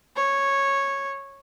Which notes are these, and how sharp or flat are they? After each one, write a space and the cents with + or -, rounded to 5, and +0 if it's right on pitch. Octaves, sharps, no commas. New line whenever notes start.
C#5 -10